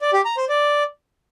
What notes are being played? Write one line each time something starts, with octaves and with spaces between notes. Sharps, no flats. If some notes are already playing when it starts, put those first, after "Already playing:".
D5
G4
A#5
C5
D5